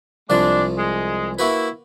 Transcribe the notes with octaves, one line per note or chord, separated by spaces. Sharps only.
C2 F3 G#3 D4 A5
G#3
A#3 E4 F#4 B4